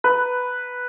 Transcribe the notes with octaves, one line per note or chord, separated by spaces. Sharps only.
B4